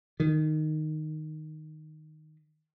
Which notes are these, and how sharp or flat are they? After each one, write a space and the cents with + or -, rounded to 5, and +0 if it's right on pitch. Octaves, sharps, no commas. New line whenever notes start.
D#3 -10